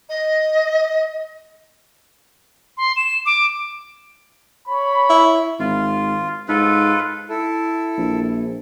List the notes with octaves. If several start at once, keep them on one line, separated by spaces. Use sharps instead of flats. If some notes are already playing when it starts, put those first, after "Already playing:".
D#5
C6
E7
D6
C#5 B5
E4
G#1 F4
G#2 F4 A4 B4
E4 A4
A#1